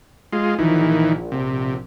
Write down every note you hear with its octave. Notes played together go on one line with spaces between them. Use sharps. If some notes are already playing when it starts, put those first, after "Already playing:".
G#3 F4
A#1 D#3 E3
C3